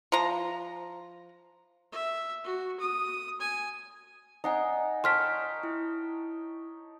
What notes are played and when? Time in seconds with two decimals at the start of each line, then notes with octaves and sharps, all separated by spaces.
0.12 F3 A#5
1.92 E5
2.44 F#4
2.79 D#6
3.40 G#5
4.44 D#4 D#5 F#5 G#5
5.04 C#5 G5 A5 C6 F6 B6
5.63 E4